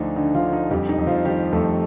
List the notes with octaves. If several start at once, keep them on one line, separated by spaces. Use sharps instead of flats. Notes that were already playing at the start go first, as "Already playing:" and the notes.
Already playing: D2 D3 F3 D4 D#4
D3 D#4
F3 F4
D3
D#4
F2 G3 G4
D#4
F2
F3 F4
D#3 G3 G4
F2 A3 A4